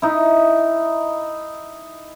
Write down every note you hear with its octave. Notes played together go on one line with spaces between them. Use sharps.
D#4 E4